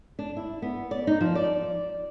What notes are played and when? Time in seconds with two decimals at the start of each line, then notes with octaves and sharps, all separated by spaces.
0.19 D4
0.37 E4
0.62 B3
0.91 D5
1.07 D#4
1.21 F3
1.35 D5